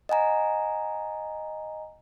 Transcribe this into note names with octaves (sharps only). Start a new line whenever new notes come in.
D#5 F#5 G#5 A#5